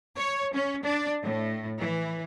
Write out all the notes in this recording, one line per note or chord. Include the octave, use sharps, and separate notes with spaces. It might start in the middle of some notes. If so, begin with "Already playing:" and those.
C#5
C#4
D4
A2
E3